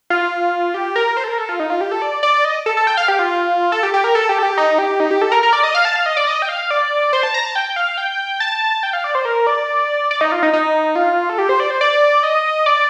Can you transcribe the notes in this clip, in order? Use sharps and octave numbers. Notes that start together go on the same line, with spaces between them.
F4
G4
A#4
C5
A4
A#4
A4
F4
D#4
F4
G4
A4
D5
D5
D#5
A4
A4
G5
F5
G4
F4
A4
G4
G4
A#4
A4
G4
A4
G4
D#4
G4
D#4
G4
A4
A#4
A#4
D5
D#5
F5
A5
F5
D#5
D5
D#5
G5
F5
D5
C5
A5
A#5
A5
G5
F5
G5
A5
G5
F5
D5
C5
A#4
D5
D5
D#4
F4
D#4
D#4
F4
A4
G4
C5
D5
C5
D5
D#5
D5